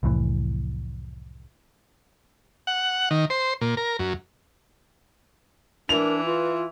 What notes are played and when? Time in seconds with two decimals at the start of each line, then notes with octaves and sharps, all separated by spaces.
0.03 C2 F2 A2 E3
2.67 F#5
3.11 D#3
3.30 C5
3.61 A#2
3.77 A#4
3.99 F#2
5.89 E3 D4 A#4 F7
6.25 F4 B4